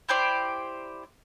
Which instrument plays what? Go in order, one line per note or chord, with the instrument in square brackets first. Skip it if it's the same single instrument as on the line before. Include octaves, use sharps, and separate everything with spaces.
[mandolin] E4 G4 C5 D5